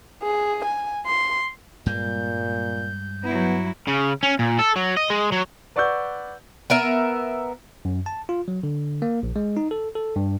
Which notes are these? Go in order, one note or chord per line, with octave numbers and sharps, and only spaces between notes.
G#4
G#5
C6
G2 A#2 G3 G#3 G6
F#3 B3 E4
C#3
C#4
A#2
A4
F#3
D#5
G#3
F#3
B4 D5 F#5 C#6 E6 G6
B3 A#4 E5
F#2
A5
F4
F#3
D3
A#3
A#1
G#3
D#4
A4
A4
G2